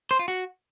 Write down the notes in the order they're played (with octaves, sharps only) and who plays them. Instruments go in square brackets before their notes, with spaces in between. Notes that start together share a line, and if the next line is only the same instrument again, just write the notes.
[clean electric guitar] C5
F4
F#4